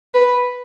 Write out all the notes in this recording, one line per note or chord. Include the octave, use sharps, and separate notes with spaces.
B4